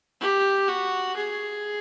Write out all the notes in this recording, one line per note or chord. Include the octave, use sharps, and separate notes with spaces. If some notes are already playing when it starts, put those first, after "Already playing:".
G4
F#4
G#4